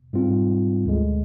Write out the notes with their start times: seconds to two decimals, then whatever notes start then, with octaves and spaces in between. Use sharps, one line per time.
0.13 G#2 G3 C4 F4
0.86 D2 D3 G#3